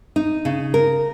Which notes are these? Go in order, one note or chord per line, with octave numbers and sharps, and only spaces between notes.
D#4
C#3
A#4